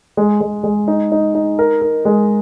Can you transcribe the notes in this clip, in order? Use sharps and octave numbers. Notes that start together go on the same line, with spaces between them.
G#3
G#3
G#3
D#4
D#4
D#4
A#4
A#4
G#3